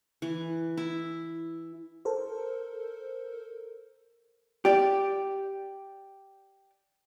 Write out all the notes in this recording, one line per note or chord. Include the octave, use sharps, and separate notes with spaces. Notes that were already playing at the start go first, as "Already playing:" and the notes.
E3
E4
A4 A#4 C5
G4 D5